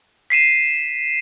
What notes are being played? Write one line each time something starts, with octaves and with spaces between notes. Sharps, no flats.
B6 C7 D#7 E7